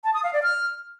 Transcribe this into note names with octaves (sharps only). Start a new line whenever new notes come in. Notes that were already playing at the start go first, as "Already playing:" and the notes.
A5
D#6
F5
D5
F6